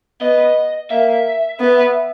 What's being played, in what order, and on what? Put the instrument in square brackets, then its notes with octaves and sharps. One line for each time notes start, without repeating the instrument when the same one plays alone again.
[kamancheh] B3 [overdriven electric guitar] D#5
[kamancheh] A#3 [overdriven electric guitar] E5
[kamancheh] B3